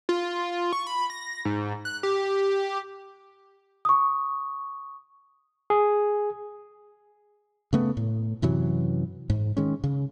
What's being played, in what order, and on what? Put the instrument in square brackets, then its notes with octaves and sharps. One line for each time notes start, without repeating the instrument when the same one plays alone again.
[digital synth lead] F4
C#6
B5
A#6
G#2
F#6
G4
[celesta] C#6 D#6
[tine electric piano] G#4
[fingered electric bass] C#3 A3 B3
A2
F#2 C3 E3 F#3
G#2
D#3 G#3 C#4
C#3